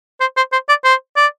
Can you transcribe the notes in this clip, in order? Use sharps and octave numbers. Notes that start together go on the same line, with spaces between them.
C5
C5
C5
D5
C5
D5